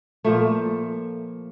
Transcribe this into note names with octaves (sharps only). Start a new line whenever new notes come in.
A#2 F3 A3